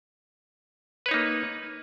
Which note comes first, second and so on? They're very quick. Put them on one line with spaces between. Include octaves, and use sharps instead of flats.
B4 C#5 D#4 A#3